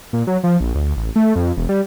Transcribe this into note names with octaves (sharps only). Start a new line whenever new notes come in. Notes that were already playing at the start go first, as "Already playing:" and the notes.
A#2
F#3
F3
A#1
D2
A1
A3
F2
E1
G3